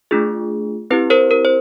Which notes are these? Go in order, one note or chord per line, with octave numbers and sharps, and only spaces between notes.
A3 D4 F4 G#4
C4 E4 G4 B4
A#4 C5
A#4
C5